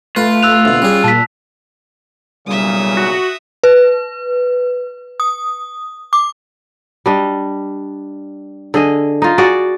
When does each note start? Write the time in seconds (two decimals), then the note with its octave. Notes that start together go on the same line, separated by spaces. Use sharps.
0.16 A3 F4 B4
0.43 E6 F#6 F7
0.65 D2 B2
0.82 G3 C#4 G#4
1.04 A#2 A5 B6
2.47 B1 A#2 C#3 G3 E5 D#6
2.97 F#4
3.64 B4
5.20 D#6
6.13 D6
7.06 G3 D4 D#5
8.74 D3 G#4 D#5
9.22 D#4 F4
9.38 F#4 G#4 D5